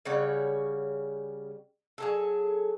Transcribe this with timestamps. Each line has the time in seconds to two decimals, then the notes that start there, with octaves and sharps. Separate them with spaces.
0.05 C#3 G3 C#5 F#5
1.98 F#3 G#4 A4